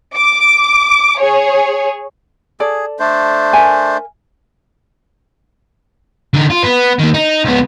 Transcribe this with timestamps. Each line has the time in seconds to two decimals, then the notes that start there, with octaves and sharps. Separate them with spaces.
0.16 D6
1.20 G#4 C#5
2.60 G#4 A4 D5
2.99 A3 D4 C5
3.53 A#4 E5 G#5
6.34 D3 D#4
6.50 F4
6.63 B3
6.99 D#3 A#3
7.14 D#4
7.45 C#2 B3